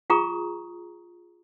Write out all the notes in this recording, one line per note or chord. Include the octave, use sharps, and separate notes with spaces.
F4 G#4 A#5 C#6 D#6